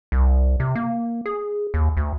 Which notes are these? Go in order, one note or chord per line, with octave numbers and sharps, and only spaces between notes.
C2
C3
A#3
G#4
D#2
D2